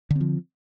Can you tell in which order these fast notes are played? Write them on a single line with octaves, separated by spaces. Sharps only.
D3 C4 F3